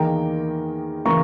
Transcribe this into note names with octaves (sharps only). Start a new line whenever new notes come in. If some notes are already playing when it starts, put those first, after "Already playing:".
Already playing: E2 D#3 A#3 G5 A#5
C#3 E3 A#3 A#5 C#6